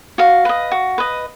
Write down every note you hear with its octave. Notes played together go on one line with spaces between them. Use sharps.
F#4 F5
B4 D#5
F#4
B4 D#5